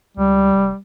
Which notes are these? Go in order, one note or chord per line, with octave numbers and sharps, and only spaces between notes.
C#2 G3
F1